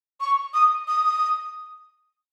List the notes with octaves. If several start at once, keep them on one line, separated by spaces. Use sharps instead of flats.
C#6
D#6
D#6